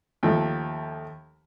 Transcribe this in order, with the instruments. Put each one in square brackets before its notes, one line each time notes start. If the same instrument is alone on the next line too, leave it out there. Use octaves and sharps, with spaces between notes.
[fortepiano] D#2 F3 A3